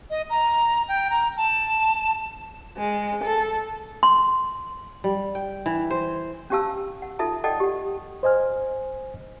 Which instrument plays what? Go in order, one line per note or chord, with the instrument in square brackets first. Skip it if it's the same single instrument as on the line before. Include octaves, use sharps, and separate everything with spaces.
[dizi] D#5
A#5
G5
A#5
A5
[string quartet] G#3
A4
[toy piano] C6
[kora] G3
G5
E3
C5
[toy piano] C#4 D4 G4 F5 A5 E6
F#5
D#4 F4 A4 E5 A5
A4 D5 D#5 F#5 G5 A5
G4 F#5
[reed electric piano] C5 D#5 G#5 F6